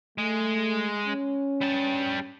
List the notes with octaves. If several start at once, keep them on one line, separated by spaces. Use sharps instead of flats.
G#3 A3
C#4
G3 A5